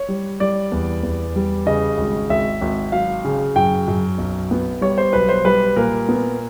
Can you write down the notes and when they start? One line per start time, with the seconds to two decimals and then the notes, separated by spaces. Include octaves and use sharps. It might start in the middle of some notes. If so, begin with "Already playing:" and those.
Already playing: C#5
0.09 G3
0.40 G3 D5
0.72 E2
1.03 E2
1.36 G3
1.66 C#3 D#5
1.98 G#1
2.30 G#1 E5
2.61 G#1
2.92 F#3 F5
3.24 C#3
3.56 F#2 G5
3.88 F#2
4.18 B1
4.51 B3
4.81 G3 C#5
4.98 C5
5.13 B1 B4
5.29 C5
5.45 G3 B4
5.76 A#2 A#4
6.09 B3